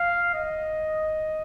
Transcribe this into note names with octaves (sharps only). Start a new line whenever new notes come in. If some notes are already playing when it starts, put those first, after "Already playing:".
Already playing: F5
D#5